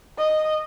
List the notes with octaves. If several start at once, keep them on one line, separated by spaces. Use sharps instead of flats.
D#5